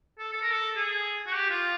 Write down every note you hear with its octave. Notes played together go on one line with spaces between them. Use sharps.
A4
A4
A#4
A4
G#4
F#4
G4
F4